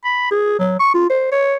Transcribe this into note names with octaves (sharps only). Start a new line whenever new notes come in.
B5
G#4
F#3
C#6
F4
C5
C#5